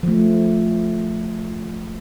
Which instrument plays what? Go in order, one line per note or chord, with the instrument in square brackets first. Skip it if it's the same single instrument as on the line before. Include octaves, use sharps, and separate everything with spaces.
[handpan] F3 A3